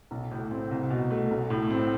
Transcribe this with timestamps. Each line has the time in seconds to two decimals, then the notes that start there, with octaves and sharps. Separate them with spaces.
0.11 B1
0.31 A2
0.51 C4
0.71 C2
0.90 B2
1.10 A3
1.31 B1
1.50 A2
1.70 C4